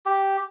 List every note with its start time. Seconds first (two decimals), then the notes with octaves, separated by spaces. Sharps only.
0.06 G4